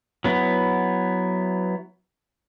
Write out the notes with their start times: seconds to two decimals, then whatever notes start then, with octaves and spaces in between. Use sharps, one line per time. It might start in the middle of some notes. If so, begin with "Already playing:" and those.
0.24 F#3 B3 E4